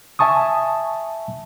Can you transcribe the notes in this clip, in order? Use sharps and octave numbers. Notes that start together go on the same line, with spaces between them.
E5 G#5 A5 C#6 D#6